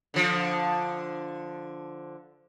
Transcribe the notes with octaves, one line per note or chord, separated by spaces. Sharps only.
D3 F3